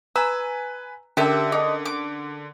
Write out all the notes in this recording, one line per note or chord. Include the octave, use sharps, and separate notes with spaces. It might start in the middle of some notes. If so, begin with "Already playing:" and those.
B4 G#5 A#5 E6
D3 C#4 G4 A#4 E5 A5
D#4 G#4
D6